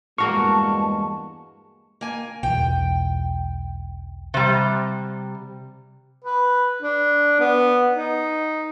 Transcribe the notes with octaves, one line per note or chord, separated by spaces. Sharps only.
E2 G2 G#3 A#3 F#4 F5 A5 C#6
A#3 G#5
B1 E2 G5
C3 G3
B4
D4
B3
D#4